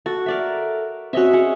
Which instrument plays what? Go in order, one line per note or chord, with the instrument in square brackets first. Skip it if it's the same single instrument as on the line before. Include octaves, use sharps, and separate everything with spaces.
[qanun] F#4 [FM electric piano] A4
[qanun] A#4 D5 E5
[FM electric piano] C4 F#4 [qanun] C#4 D#5 E5
[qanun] C#4 G#4 F#5